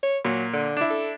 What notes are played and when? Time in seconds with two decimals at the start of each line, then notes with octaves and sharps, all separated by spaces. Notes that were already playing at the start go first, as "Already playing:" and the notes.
0.03 C#5
0.25 A#2 F#3
0.53 D3
0.77 D4 E4
0.90 A4